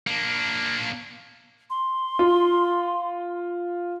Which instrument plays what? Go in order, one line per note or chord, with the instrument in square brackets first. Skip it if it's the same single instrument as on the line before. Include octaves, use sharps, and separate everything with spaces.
[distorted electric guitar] A#3 D4
[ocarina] C6
[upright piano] F4